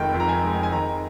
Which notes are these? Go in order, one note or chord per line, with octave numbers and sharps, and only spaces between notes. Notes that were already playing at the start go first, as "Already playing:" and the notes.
Already playing: F1 F2 D#3 G#3 G5
F2
A#5
G#5
G#3
G#5
D#3 A#5